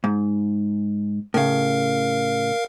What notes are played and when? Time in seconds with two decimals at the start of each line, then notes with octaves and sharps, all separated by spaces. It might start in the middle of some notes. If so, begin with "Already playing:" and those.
0.04 G#2
1.34 A2 C#3 A#4 F5